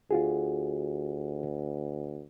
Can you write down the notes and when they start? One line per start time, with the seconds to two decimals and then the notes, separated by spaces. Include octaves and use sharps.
0.11 D2 F4 F#4 G#4